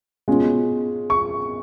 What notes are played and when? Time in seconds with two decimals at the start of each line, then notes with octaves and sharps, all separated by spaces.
0.28 B2 G#3 C#4 F4
1.10 C#6